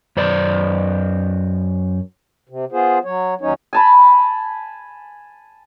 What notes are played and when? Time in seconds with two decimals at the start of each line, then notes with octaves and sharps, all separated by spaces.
0.17 F#2 C5 D5
2.49 C3
2.72 B3 F4 G#4 C5
3.04 F#3 C#5
3.41 D#2 F#3 C#4 D#4 C#5
3.73 G#5 A5 B5